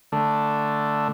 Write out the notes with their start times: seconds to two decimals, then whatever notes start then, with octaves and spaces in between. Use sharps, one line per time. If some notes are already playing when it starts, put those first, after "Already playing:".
0.12 D3 A3